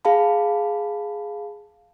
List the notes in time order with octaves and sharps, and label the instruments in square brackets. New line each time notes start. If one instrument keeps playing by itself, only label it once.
[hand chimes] G#4 F5 A5 B5